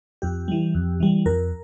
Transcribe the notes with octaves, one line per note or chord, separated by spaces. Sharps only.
F2 G4
E3 G3
F2
E3 G3
F2 A#4